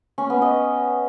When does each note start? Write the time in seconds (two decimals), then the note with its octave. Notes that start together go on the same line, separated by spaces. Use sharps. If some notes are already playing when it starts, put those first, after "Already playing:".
0.18 C#4
0.30 B3
0.42 D#5